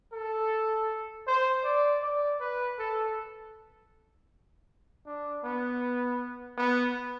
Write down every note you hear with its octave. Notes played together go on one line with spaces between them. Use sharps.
A4
C5
D5
D5
B4
A4
D4
B3
B3